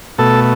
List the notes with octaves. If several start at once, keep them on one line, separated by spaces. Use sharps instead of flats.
B2 A3 A4